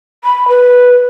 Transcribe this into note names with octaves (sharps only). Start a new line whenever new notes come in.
B5
B4